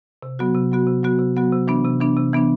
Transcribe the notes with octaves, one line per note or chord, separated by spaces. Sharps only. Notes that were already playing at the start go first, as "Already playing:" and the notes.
C3
F#3 B3 F#4
C3
F#3 B3 F#4
C3
F#3 B3 F#4
C3
F#3 B3 F#4
C3
E3 B3 D4
C3
E3 B3 D4
C3
E3 B3 D4